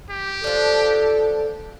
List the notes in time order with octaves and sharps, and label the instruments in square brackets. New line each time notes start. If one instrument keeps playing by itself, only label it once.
[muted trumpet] G4
[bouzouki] F3 D4 [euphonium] A4